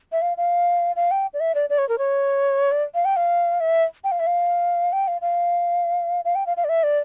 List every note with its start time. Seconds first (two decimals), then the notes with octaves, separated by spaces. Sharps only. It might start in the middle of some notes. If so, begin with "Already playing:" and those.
0.12 E5
0.22 F5
0.37 F5
0.96 F5
1.11 G5
1.34 D5
1.40 E5
1.55 D5
1.70 D5
1.78 C#5
1.89 A#4
1.98 C#5
2.71 D5
2.95 F5
3.05 G5
3.16 F5
3.60 E5
4.04 G5
4.11 F5
4.19 E5
4.27 F5
4.92 G5
5.08 F5
5.21 F5
6.25 F5
6.35 G5
6.46 F5
6.57 F5
6.64 D5
6.69 E5
6.83 D5